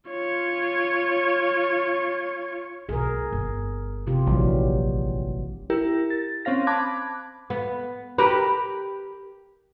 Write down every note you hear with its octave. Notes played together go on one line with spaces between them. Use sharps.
F4 C#5
B1 G#4 A#4
G1
C3 F4 G4
A#1 E3 F#3 G3
E4 G4 A#4
A6
C4 C#4 C5 F5 A#6
A5 B5 D6 F#6 G#6
B3
G4 A#4 B4